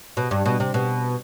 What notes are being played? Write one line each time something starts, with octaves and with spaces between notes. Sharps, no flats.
B2
G2
B2
C3
B2